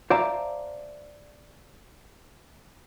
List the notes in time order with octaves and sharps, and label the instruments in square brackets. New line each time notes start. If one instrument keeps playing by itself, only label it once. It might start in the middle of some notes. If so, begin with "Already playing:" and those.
[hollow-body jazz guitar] C5 D5 E5 F5 A5 A#5